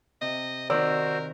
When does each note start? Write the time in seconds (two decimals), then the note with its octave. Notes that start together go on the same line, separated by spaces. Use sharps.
0.21 C3 D#5
0.70 D#3 C4 F#4 A#4 C5 D5 E6